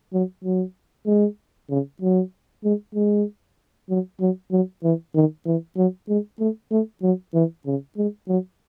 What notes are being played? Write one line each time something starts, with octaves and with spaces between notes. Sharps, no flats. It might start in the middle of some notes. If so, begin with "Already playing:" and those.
F#3
F#3
G#3
C#3
F#3
G#3
G#3
F#3
F#3
F#3
E3
D#3
E3
F#3
G#3
A3
A3
F#3
E3
C#3
G#3
F#3